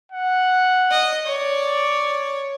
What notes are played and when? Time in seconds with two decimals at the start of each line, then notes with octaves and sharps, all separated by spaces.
0.12 F#5
0.91 D#5
1.26 C#5 D5